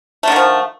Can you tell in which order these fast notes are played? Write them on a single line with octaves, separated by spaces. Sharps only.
A3 D3 D#3 F3